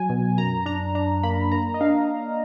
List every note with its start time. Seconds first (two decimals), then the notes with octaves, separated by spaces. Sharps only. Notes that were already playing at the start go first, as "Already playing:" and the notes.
Already playing: F#3 G#5
0.09 B2
0.38 F#2 A#5
0.66 D4 A#5
0.95 D4 A#5
1.23 A#3 B5
1.52 A#3 A#5
1.74 D#5
1.81 D4 F5